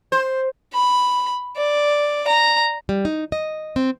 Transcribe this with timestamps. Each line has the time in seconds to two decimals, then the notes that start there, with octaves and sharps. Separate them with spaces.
0.12 C5
0.74 B5
1.57 D5
2.28 A#5
2.89 G3
3.05 D#4
3.32 D#5
3.76 C4